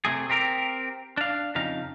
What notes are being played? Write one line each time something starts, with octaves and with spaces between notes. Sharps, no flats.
C3 A3 G#4
C4 G4 A#4
D4 F5
F2 C#3 D#4 F5